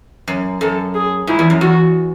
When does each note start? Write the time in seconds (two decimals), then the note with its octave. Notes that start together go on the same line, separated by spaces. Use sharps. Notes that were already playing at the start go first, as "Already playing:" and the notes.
0.28 F#2
0.61 F#2 A4
0.94 G#4
1.27 G#2 E4
1.39 E2
1.50 F#2
1.61 E2 F#4